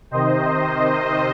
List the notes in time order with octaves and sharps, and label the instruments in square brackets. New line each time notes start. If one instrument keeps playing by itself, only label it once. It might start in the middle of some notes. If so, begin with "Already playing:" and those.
[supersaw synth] C3 D#3 C5 D#5